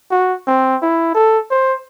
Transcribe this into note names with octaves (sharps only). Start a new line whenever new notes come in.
F#4
C4
E4
A4
C5